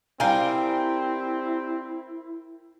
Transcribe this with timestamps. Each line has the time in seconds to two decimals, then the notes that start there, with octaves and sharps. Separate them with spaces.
0.20 G3 C4 E4 A#4 F5 G5 G#5